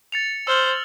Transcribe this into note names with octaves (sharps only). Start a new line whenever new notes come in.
A6 C#7 F7
C5 E6 F6 F#7